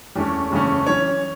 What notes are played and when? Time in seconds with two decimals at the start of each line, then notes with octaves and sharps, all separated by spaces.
0.16 E2 E3 A3 C#4
0.51 F#1 E2 C#3 A3 C#4
0.87 F#2 E3 C#4 C#5